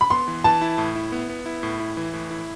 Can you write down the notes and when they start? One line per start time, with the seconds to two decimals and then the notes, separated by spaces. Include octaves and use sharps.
0.01 B5
0.10 B3 C6
0.28 E3
0.44 E3 A5
0.62 E4
0.78 A2
0.95 E4
1.12 B3
1.29 B3
1.46 E4
1.63 A2
1.80 E4
1.97 E3
2.13 A2
2.31 E4